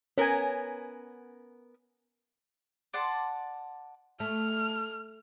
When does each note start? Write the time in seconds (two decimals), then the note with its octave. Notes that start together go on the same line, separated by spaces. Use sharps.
0.18 B3 C#4 A#4 G#5
2.94 D5 F#5 A5 C6
4.20 A3 F6